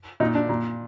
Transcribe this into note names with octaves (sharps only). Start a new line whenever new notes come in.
A#2 D#4
D4
A#2